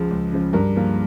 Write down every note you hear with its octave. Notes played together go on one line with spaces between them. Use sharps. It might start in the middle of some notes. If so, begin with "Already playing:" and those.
Already playing: C#2 C#3 F3 G#3
C#2
C#3 F3 G#3
G2 A#4
F3 A#3